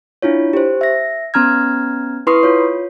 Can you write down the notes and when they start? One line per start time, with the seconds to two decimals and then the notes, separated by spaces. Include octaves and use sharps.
0.22 D4 E4 F4 C#5
0.53 G4 C5
0.81 E5 A#6
1.34 B3 C#4 A#5 F6 G#6
2.27 E4 B4 C6 C#6 D#6 C7
2.43 F4 C#5